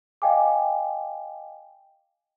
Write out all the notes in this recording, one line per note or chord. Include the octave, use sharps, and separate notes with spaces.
D#5 F5 G5 G#5 D6